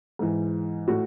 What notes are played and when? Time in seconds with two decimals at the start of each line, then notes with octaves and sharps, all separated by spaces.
0.19 G#2 E3
0.88 A2 F#4